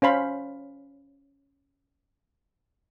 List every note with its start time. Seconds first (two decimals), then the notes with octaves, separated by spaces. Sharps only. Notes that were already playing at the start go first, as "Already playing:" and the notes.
0.02 C#4 C5 F5 B5